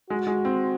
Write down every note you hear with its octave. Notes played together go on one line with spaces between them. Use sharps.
G#3 F#4
G#3
C4